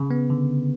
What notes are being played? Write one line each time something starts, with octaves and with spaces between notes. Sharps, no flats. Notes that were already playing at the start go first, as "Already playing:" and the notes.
Already playing: C#3
B3
D3